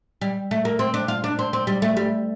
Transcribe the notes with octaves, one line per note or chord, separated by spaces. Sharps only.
G3
A3
A#3
C4
D4
F4
D4
C4
C4
G3
A3
G3